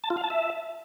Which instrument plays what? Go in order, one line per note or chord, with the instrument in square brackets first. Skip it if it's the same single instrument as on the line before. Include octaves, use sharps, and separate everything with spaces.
[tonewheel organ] A5
F4
F5
A5
E5